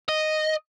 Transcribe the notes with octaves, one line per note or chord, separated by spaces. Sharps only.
D#5